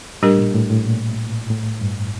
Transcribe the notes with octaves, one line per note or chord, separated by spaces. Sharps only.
A2 G3 D4 G4 A#4
A#2
A2
A2
A#2
A2
G2